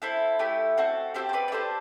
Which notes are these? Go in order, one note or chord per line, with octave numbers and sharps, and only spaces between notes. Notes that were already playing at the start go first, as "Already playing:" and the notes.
C4 E4 A4
A3 E4 G4
C4 F#4 A4
C4 E4 G4 A4 C5
C5
B4 D5
D5
D4 G4 A4 C5